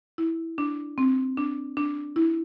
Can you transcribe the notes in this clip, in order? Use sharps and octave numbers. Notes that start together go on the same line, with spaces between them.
E4
D4
C4
D4
D4
E4